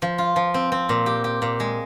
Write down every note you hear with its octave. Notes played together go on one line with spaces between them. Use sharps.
F3
F4
F3
C4
C4
A#2
G4
G4
A#2
G#3